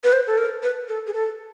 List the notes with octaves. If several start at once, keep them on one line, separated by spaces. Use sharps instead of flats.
B4
C5
A4
A#4
B4
A4
G#4
A4